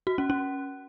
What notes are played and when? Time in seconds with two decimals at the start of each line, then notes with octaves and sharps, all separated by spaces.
0.07 F#4
0.18 C#4
0.30 C#4